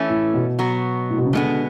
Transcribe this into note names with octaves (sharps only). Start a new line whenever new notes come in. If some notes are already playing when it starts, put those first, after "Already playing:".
Already playing: E3 A3 C#4
A2
B2
F#3 B3 F#4
A2
B2
C#3
B2 D3 G#3 B3